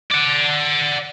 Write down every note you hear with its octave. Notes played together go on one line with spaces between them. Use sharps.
D5 F#5